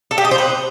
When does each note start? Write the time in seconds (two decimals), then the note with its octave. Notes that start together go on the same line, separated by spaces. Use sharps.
0.11 A4
0.18 G4
0.25 D#5
0.31 C5
0.38 B4